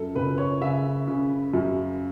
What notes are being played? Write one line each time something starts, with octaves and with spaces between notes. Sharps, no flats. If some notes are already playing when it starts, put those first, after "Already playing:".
Already playing: F#2 A4
F#1 B4
C#5
C#3 E5
C#3
F#2